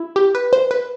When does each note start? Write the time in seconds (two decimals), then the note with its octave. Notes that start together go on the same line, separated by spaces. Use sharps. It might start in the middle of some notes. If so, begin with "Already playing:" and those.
Already playing: E4
0.16 G4
0.35 B4
0.53 C5
0.71 B4